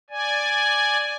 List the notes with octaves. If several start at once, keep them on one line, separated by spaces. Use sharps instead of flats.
D5 G#5